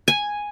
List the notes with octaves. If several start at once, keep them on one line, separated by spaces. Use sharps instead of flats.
G#5